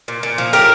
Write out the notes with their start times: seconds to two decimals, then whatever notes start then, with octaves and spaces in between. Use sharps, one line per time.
0.08 A#2
0.23 A#2
0.38 F3
0.53 A2 G4 A#4